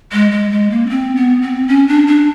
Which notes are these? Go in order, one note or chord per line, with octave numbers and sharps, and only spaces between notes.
G#3
G#3
G#3
A#3
C#4
C4
B3
C4
C#4
D4
D4